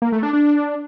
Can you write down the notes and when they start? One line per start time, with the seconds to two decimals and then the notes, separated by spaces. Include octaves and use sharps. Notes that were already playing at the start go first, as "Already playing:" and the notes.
0.02 A#3
0.12 A3
0.23 D4
0.33 D4